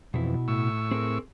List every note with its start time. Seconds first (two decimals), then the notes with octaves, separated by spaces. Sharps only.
0.14 F2 B2 E3 E4
0.48 A2 C#6 E6
0.91 C4 G#4 A#4